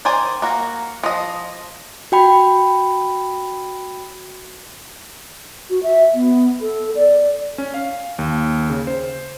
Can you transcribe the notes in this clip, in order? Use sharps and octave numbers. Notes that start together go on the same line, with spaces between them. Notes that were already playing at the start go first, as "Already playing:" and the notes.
D#3 C5 D5 G#5
A#3 F#4
F3 D#5
F#4 G5 B5
F#4
E5
B3
A4
D5
C#4
F5
D#2
C#3
C5